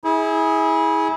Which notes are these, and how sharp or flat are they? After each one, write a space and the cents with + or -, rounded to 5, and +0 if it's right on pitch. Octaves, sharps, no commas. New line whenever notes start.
E4 -30 G#4 +0